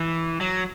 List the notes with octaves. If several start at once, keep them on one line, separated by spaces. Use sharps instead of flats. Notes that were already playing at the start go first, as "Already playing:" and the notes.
Already playing: E3
F#3